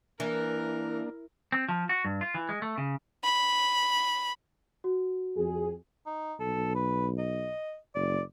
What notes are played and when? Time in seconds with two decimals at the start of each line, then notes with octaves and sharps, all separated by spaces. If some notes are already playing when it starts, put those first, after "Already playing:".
0.20 E3 A#3 D4 A#4
1.52 C4
1.69 F3
1.89 F#4
2.05 G2
2.21 F4
2.34 E3
2.49 G#3
2.62 A3
2.78 C#3
3.23 B5
4.84 F#4
5.37 F2 G#4
6.06 D#4
6.40 B1 A4
6.75 B4
7.18 D#5
7.95 F#1 D5